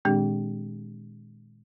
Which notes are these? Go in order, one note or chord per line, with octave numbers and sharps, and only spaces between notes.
A#2 D#3 G#3 C4 D4 G4